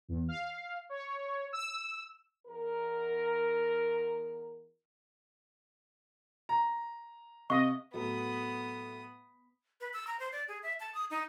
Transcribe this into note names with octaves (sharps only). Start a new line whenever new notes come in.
E2
F5
C#5
E6
E2 A#4
A#5
C3 D#5 F5 C#6
A2 F#3 A3 B3 D#6
B4
E6
A#5
C5
D5
G#4
E5
A5
D#6
D#4